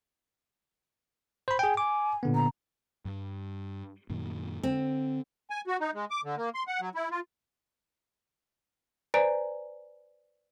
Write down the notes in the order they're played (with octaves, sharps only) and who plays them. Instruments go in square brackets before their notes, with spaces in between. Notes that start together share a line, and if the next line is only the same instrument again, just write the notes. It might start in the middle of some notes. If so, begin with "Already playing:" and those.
[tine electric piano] C5 B5
[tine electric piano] G#4 G5 [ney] G#5
[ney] G#5 [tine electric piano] D6
[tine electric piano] A#2 D3 B3
[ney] A#5
[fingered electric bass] G2 G3
F#2 A#2 D#3
[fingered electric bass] D3 [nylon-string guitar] C4
[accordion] G#5
F#4
D#4
G#3
D6
D3
A#3
C6
F#5
F#3
E4
F4
[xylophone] B4 C5 D5 G#5 A#5 D7